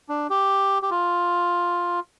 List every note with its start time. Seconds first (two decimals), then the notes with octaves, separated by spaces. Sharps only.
0.09 D4
0.30 G4
0.82 G4
0.91 F4